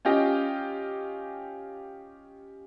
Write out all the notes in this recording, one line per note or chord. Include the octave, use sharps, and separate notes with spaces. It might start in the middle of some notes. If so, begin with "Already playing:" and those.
C#4 F4 G4 D#5